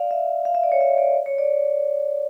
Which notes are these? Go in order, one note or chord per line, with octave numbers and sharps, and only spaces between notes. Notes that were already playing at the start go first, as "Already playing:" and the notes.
Already playing: D5 F5
E5
F5
E5
D5
C#5
E5
D5
C#5
D5